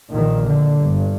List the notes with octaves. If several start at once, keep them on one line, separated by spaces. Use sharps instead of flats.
A#1 A#2 D#3
D3
G1 G2